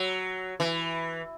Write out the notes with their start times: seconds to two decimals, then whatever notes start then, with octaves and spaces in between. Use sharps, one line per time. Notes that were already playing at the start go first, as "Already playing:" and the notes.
Already playing: F#3
0.60 E3